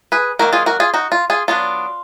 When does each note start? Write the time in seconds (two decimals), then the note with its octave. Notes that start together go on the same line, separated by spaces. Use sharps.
0.12 G#4 B4
0.39 D#3 F#3 A#3 F#4 A#4
0.53 F4 G#4
0.66 F#4 A#4
0.80 F4 G#4
0.94 D#4 F#4
1.12 F4
1.30 F4 G#4
1.48 F#3 B3 D4 F4